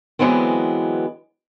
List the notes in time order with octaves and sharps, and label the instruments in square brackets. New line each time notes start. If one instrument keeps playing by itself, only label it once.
[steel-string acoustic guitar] D3 E3 F#3 G#3 B3 C4